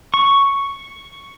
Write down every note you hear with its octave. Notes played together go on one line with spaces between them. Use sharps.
C#6